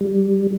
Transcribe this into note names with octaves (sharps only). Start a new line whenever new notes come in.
G3